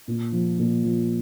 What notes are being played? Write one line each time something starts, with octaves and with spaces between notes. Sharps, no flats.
A#2
F3
A#2
F3